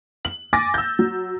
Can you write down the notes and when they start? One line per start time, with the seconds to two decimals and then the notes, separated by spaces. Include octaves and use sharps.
0.25 F#7
0.53 G#5 D6 A6 A#6
0.74 E6 G6
0.99 F#3